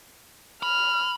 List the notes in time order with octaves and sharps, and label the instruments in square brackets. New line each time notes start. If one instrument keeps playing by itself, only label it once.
[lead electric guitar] B5 [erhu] F6